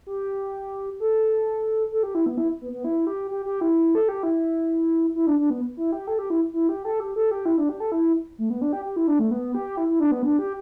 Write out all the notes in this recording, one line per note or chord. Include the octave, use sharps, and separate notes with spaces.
G4
A4
A4
G4
E4
B3
E4
B3
B3
E4
G4
G4
G4
E4
A4
G4
E4
E4
D4
D4
B3
E4
G4
A4
G4
E4
E4
G4
A4
G4
A4
G4
E4
D4
G4
A4
E4
A3
B3
D4
G4
G4
E4
D4
A3
B3
G4
E4
E4
D4
B3
D4
G4